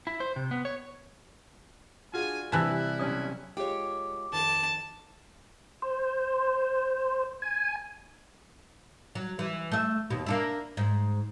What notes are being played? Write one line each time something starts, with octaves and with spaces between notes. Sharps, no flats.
E4
C5
C3
B3
C#5
D4 F4 F#4 G#4 G#5
C3 E3 G3 E4 G#5 A5 E6 F#6
B1 C#4 D#6
G#3 F4 G4 C#5
F2 D#3 A5
C5
G#5
F#3
E3
A3 E5
D#2 B2
A#3 D4 E4
G#2